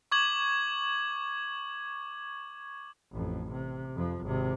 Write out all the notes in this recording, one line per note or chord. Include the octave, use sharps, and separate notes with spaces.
C#6 D6 G#6 F#7
A1 F2
C3
F2 F3
G#1 C3